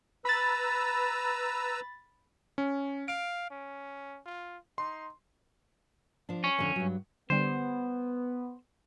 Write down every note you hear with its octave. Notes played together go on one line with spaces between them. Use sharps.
B4 A#5 B5 E6 A6
C#4
F5 D7
C#4
F4
D#4 C6
F3 D4
C#4
F2 D3
G2 F#3
D3 G3 B3 C5